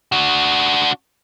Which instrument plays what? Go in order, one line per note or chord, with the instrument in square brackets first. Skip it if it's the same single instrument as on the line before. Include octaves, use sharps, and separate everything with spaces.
[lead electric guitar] D4 F#4